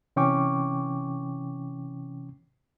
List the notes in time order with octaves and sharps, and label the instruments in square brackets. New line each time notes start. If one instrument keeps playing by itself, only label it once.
[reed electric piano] C3 E3 C#4 G5 C#6 D6